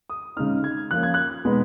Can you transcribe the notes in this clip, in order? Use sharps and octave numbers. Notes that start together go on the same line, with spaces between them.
D#6
C#3 G#3 D#4 F6
G#6
F3 A#3 C#4 F4 F#6
G#6
F#6
B2 G#3 B3 D#4